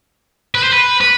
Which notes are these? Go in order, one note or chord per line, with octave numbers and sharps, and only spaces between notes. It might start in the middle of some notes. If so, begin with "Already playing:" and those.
B4
C5
B4
B4